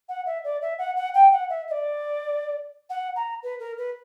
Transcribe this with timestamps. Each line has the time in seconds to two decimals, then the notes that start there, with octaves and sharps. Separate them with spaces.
0.09 F#5
0.26 E5
0.44 D5
0.61 E5
0.78 F#5
0.96 F#5
1.14 G5
1.32 F#5
1.49 E5
1.67 E5
1.71 D5
2.90 F#5
3.16 A#5
3.43 B4
3.59 A#4
3.78 B4